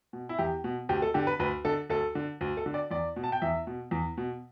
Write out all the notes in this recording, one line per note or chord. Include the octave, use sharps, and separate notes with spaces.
B2
E4
E2 G4
B2
D2 G4
A4
D3 G4
B4
D2 B4
D3 A4
D2 A4
D3
D2
A4
D3
D5
E2 D5
B2
A5
G5
E2 E5
B2
E2
B2